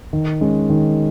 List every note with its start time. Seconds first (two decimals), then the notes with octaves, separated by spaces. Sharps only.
0.13 D#3
0.41 G#3 C#4
0.70 D#3